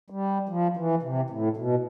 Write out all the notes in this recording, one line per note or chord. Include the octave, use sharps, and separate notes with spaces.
G3
F3
E3
C3
A2
B2